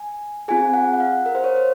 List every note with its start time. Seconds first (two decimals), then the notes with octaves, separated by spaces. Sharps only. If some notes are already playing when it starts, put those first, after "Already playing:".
Already playing: G#5
0.48 C4 F4 G#4 G#5
0.74 F#5
0.93 F#5
1.00 F5
1.26 A#4
1.35 C5
1.44 C#5
1.56 C5